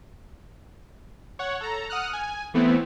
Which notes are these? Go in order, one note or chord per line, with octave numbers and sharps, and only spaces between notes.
C#5 F#5
A4 A#5
F#5 D#6 F6 F#6
G#5
E3 A3 B3 C4 E4